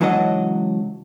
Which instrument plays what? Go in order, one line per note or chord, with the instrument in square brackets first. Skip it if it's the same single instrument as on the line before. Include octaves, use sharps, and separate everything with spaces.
[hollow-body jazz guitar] C#2 E3 F#3 D4 D#5 F#5